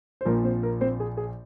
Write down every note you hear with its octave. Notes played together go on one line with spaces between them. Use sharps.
C5
A#1 A#2 F3 A#4
C4 C5
A#4
C4 C5
G#4
G#4